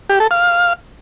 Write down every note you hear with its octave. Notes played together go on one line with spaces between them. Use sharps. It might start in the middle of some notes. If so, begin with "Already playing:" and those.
G4
A4
F5